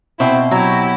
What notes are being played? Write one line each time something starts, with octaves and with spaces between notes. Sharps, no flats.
B2 C4 E4
F#3 E4 G4